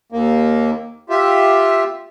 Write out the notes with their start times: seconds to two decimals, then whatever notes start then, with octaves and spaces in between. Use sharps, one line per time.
0.12 D#2 A#3
1.10 F4 G4 E5